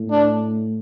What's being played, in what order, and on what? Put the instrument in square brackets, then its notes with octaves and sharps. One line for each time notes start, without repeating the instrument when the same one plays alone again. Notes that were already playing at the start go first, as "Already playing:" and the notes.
Already playing: [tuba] A2
[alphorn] D4